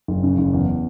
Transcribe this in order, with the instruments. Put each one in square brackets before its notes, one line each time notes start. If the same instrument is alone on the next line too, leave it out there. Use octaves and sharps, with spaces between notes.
[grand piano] F#1
C#3
F#1
E2